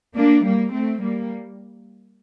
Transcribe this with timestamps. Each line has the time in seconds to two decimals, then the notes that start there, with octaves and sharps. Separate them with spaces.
0.16 A#3 D4
0.45 G3 A#3
0.73 A3 C4
1.02 G3 A#3